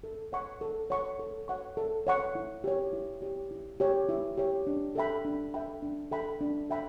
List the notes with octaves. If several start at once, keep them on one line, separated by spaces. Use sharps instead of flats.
A4
C#5 F#5 C#6
A4
C#5 F#5 C#6
A4
C#5 F#5 C#6
A4
C#5 F#5 C#6
E4
G4 C#5
E4
G4 C#5
E4
G4 C#5
E4
G4 C#5
D4
A4 E5 G5 B5
D4
A4 E5 G5 B5
D4
A4 E5 G5 B5
D4
A4 E5 G5 B5